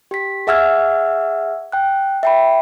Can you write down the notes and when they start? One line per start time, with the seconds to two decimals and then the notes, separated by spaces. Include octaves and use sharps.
0.11 G4 B6
0.47 G#4 E5 F#5 E6 F6 G#6
1.72 G5 F#6
2.23 E5 G5 B5